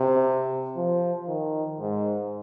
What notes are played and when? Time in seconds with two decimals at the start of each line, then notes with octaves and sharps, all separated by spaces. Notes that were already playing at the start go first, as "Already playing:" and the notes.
Already playing: C3
0.77 F3
1.28 D#3
1.80 G#2